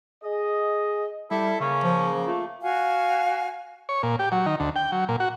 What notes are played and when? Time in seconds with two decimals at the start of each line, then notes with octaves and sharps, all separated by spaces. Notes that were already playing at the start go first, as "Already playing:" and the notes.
0.23 G#4 D#5
1.31 G3 E4 A4
1.60 C#3 A#3 C#4
1.84 F3
2.27 A3 F4
2.62 F#4 F5 F#5 G#5
3.89 C#5
4.03 A#2
4.19 G4
4.32 F#3
4.46 D#3
4.60 D2
4.76 G5
4.92 F#3
5.09 A#2
5.20 F#4